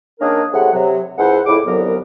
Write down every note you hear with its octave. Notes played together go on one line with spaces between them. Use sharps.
D#3 A#3 C#4 D4 G#4 A#4
A2 C3 G#3 F#5
C3 F#3
C#2 E4 G#4 C5 F#5
F2 A2 C#3 E4 D6
C2 F2 D3 F#3 B3 A#4